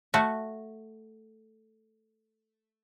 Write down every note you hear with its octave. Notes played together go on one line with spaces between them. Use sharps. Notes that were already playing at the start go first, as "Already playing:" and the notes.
A3 F#4